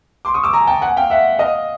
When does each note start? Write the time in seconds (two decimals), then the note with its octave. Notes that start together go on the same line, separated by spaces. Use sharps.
0.25 C6 D6
0.34 C#6 D#6
0.44 D6 E6
0.53 G#5 A#5
0.67 G5 A5
0.82 F#5 G#5
0.97 F5 G5
1.10 E5 F#5
1.39 D#5 F5